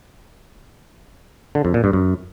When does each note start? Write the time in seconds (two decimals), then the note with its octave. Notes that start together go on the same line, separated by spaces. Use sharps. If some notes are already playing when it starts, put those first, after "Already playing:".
1.55 D3
1.65 F2
1.74 A#2
1.84 G2
1.93 F#2